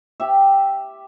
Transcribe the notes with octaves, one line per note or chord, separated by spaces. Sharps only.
G4 E5